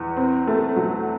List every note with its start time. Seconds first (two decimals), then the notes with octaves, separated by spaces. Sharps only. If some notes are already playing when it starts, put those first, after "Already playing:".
Already playing: E2
0.17 C4
0.47 A3
0.76 F#3